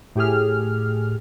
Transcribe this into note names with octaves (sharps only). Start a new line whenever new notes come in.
A2 G4 G#4 F6